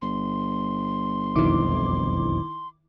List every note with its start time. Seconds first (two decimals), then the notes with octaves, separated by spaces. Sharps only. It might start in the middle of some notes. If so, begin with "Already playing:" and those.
0.02 G1 C6
1.36 E1 B1 F2 D#3 E4 D6